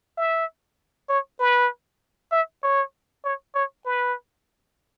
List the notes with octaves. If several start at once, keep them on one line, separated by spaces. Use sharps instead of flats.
E5
C#5
B4
E5
C#5
C#5
C#5
B4